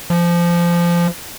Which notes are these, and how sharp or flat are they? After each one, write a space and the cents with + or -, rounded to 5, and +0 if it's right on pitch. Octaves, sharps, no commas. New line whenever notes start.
F3 -20